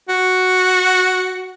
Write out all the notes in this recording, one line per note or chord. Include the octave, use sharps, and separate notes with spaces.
F#4